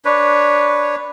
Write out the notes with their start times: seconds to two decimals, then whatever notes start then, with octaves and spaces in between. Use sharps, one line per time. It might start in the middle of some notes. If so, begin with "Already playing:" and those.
0.05 D4 B4 C#5